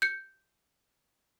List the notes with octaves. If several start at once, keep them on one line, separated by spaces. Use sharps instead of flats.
G6 C#7